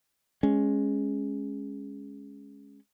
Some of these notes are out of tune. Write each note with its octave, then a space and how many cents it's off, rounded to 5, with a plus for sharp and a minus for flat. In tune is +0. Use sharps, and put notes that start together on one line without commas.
G#3 +0 C#4 +0